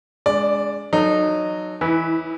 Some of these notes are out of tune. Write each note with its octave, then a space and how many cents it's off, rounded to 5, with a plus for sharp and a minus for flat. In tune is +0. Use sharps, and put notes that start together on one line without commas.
G#3 +0 D4 -35 D5 +0
F#3 +0 D#4 -20 A4 +0
E3 +0 E4 -30 B4 +0